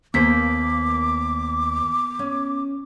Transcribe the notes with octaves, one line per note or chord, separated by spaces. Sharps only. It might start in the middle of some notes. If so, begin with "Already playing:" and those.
D#2 A#3 B3 C5 D6 B6
C#4